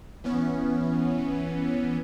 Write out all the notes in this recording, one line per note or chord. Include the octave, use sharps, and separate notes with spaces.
E3 B3 C#4